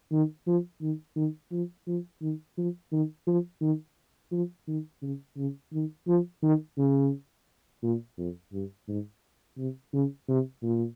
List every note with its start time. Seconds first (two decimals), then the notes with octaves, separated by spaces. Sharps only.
0.12 D#3
0.47 F3
0.81 D#3
1.16 D#3
1.51 F3
1.87 F3
2.21 D#3
2.57 F3
2.92 D#3
3.27 F3
3.61 D#3
4.31 F3
4.67 D#3
5.02 C#3
5.37 C#3
5.73 D#3
6.07 F3
6.43 D#3
6.78 C#3
7.83 A#2
8.18 F2
8.53 G2
8.88 G#2
9.58 C3
9.93 C#3
10.28 C3
10.63 A#2